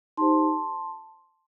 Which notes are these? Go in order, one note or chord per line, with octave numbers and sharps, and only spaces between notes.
D#4 G4 C5 A5 C6